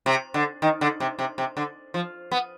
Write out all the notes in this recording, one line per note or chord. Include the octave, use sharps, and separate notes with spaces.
C3
D3
D#3
D3
C3
C3
C3
D3
F3
B3